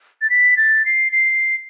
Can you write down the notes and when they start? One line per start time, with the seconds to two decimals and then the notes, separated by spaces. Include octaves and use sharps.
0.22 A6
0.30 B6
0.57 A6
0.86 C7
1.12 C7